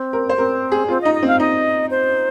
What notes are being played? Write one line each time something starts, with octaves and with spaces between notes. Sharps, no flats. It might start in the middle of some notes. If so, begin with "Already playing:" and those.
Already playing: C4
A#4
C5
C4 A#4
G#4
C4 F4
D#4 D#5
D#5
C4 F5
D#4 D#5
C5